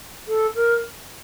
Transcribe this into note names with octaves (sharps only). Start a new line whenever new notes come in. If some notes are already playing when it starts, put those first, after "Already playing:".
A4
A#4